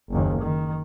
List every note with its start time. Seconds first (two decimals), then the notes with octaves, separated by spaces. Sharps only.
0.10 F#1 D#2
0.42 D#3